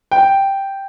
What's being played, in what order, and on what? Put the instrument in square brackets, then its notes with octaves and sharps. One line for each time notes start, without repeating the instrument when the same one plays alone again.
[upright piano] G5